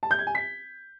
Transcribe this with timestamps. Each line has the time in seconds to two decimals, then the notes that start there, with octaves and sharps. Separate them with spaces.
0.03 A5
0.11 G6
0.19 G#6
0.27 G#5
0.35 B6